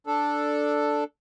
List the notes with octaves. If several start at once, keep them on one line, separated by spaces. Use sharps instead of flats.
D4 A4